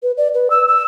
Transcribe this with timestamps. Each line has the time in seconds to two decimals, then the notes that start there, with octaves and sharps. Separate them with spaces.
0.03 B4
0.17 D5
0.34 B4
0.50 E6
0.68 E6